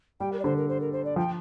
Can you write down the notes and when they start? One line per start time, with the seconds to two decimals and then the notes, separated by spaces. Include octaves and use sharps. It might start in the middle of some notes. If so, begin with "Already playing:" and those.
0.20 G3 G5
0.32 A#4
0.39 D5
0.44 D3 C5
0.56 A#4
0.68 C5
0.80 A#4
0.92 C5
1.04 D5
1.16 F3 G5